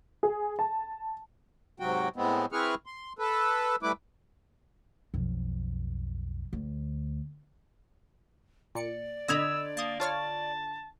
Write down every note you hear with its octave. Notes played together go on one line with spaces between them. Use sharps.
G#4
A5
G#2 C3 F#3 F#4 G5
A2 G#3 B3 C4
C4 E4 G#4 B4 C#6 F6
C6
A4 B4
G3 A3 E4 B4 D6
B1 F2
D2
A#2 D5 C#7
D3 D#5 B5 E6 G#6 F7
A#3 A5 D#6
F4 C#5 A5 F6